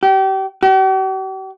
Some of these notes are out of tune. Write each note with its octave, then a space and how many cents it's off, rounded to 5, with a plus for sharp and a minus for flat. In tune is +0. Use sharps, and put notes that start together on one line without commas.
G4 -30
G4 -45